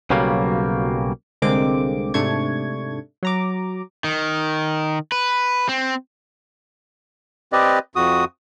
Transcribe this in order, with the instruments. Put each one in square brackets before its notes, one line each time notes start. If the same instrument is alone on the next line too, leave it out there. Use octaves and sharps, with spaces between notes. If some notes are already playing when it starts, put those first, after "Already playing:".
[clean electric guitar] B1 C#3 F#3 G3 A#3
[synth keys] C2 D3 G#3 A#3 C4 D6
G#2 C3 A3 D4 C#6 G#6
F#3 A#5 D6
[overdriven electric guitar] D#3
B4
C4
[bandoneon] C4 G4 B4 D5 D#5
F2 F#4 D#6